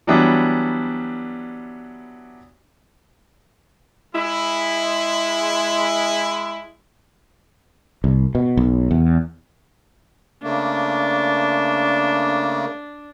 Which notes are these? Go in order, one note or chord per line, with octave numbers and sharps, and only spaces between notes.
E3 F#3 G3 B3 D4
G#3 E4
C2
B2
B1
E2
C#3 A3 A#3 D4